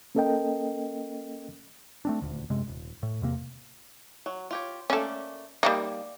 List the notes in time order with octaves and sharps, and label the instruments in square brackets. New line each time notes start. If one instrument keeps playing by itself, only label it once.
[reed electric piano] A#3 C#4 A4 A#4 D#5 G5
[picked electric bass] A3 C4 D4
D#1 D2
F#2 C3 G#3
D#1
A2
E2 C3 A#3
[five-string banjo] F#3
F4 G4 C#5
[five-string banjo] A3 A#3 D5 [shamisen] C#4 A4
[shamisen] G3 A#3 D#4 [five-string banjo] D5 F5 G5